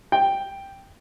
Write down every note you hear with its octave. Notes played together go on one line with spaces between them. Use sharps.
G5